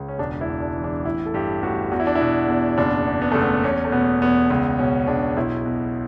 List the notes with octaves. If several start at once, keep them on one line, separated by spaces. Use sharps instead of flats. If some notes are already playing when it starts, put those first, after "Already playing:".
Already playing: C#2
C#4
E1 D4
E4
E2
D4
E3
D4
A1 E4
A4
G2 G4
A1 F#4
E2 F#4
E4
D4
E4
B2
E2
F#1 D4
E2
B3
F#1 A3
B3
E2 C#4
A3
B2 B3
E2 B3
C#2 B3
B2 C#4
C#2 D4
B1 E4
B2